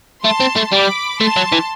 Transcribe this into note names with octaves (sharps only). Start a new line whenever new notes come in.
A3 A5 C6
C4
A3
G3 B5 D6
A3 A5 C6
F#3
E3